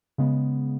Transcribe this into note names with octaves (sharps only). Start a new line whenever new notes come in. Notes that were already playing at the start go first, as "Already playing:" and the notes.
C#3 G#3 B3